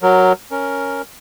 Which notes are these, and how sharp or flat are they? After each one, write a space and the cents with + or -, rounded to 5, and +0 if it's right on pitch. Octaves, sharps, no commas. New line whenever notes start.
F#3 +0 A#4 +0
C#4 +0 A#4 +0